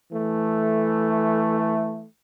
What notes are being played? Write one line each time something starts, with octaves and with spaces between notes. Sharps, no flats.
E3 A3